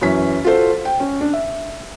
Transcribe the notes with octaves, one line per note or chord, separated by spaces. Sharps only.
F#2 E3 C#4 B6
F4 F#4 A4 C5
G5
C#4
D4
E5